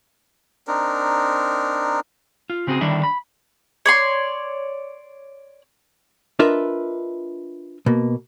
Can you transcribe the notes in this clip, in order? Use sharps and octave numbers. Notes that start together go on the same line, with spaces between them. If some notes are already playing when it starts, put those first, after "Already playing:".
C4 D4 D#4 A#4
F4
C#3 C4 F#4 G#4
D3 D#3 G3 D4 E4
B5
C#5 D5 C6
D4 F4 A#4 B4 D#5 E5
B2 A#3